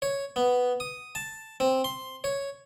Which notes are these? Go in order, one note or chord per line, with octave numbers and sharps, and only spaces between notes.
C#5
B3
D#6
A5
C4
C6
C#5